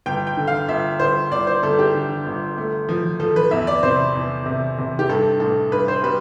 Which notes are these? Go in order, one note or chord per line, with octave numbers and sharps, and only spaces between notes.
G1 G5
G5
D3
F5
G1 E5
G1 C5
G1 D5
C5
G1 A4
G4
D3
G1
A3
F3
F3 A4
B4
E2 E5
D5
C3 C5
E2
C3
C3
G4
G2 A4
A1 A4
G2 B4
C5
G3 B4